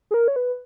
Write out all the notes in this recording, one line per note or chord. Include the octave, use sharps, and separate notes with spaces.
G#4
A#4
C#5
B4